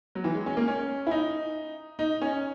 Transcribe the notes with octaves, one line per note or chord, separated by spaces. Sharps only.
F#3
E3
G#3
C#4
A#3
C#4
E4
D#4
D#4
C#4